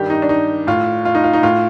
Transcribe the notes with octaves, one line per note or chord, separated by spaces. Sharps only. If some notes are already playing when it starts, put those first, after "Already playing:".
Already playing: G2 D#3 G4
D#4
D4
D#4
A2 F4
F4
D#4
F4
D#4
A2 F4